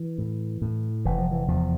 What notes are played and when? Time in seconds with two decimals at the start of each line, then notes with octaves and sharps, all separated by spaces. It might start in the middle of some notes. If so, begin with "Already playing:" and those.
Already playing: E3
0.18 A2
0.62 A2
1.05 F1 E3
1.18 F3
1.31 E3
1.48 E2 F3